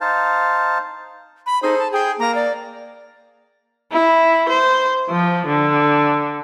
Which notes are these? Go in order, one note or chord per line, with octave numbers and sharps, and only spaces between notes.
D#4 C5 F5 A5
B5
D#4 G#4 A4 C5
A5
G#4 G5
A#3 A#5
D5
E4
C5
F3
D3